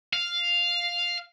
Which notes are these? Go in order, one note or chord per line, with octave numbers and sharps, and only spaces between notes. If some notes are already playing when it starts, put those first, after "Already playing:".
F5